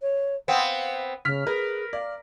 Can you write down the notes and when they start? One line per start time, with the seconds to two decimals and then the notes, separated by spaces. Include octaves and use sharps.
0.01 C#5
0.48 B3 C4 F5
1.25 C#3 F6 B6
1.47 G#4 A#4 B4
1.93 D5 F5